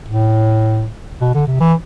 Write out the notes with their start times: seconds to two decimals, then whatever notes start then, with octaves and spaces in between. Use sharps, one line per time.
0.08 A2
1.21 B2
1.35 D3
1.47 C3
1.60 E3